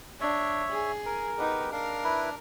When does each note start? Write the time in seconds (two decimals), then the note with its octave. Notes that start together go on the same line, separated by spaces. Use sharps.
0.21 D4 C#5 E5
0.72 G#4
1.06 A#4 G#5
1.39 B3 D#4 G4 B4
1.72 D4 A#4 F5
2.04 E4 B4